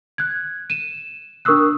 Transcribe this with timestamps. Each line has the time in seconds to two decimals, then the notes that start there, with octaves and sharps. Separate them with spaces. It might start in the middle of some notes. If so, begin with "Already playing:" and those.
0.18 F#6 G#6
0.70 D#7 E7
1.45 D4 A#4 C#6 D#6 E6 F#6